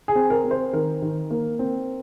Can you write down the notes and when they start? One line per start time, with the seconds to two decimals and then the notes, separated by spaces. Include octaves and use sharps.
0.08 G#4
0.15 C4
0.30 A#4
0.45 C4
0.51 C5
0.73 D#3 A#4
1.02 D#3
1.31 A#3
1.59 C4